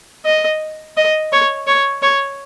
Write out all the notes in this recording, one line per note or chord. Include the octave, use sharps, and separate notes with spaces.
D#5
D#5
C#5
C#5
C#5